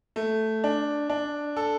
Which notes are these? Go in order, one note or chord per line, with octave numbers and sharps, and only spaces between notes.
A3
D4
D4
A4